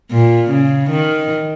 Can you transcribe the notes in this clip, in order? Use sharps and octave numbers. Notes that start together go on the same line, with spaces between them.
A#2
C#3
D#3